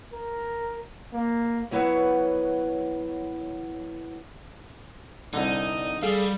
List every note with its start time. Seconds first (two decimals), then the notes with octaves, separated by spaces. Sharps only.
0.13 A#4
1.13 A#3
1.71 F#3 B3 E4 B4 C#5 F#5
5.34 C2 D3 D#4
6.03 G3 G#4 A4 F5